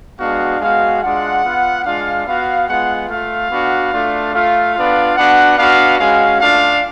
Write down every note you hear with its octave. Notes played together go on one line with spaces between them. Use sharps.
G#3 B3 D4 F#4 F5
G#3 B3 F#4 F5
G#3 D4 F4 F#5
B3 F4
G#3 D4 F4 F5
B3 F#4 F5
G#3 B3 F4 F#5
A3 F4 F5
B3 D4 F#4
A3 D4 F4
A3 F4 F5
B3 D4 F4
B3 D4 F#4 F#5
B3 D4 F#4 F5
G#3 C#4 F#4 F5
A3 D4 F4 F5